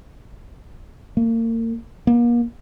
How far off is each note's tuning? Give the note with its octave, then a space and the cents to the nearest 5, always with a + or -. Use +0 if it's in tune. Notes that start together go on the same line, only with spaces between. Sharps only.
A#3 -35
A#3 +35